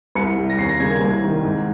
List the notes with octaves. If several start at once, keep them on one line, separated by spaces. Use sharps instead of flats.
C2 C#7
C3 G3
A#6
D#2 C7
A#6
C#3 G3 A#3 G#6
G#6
C2
C3 D#3 G3
G#2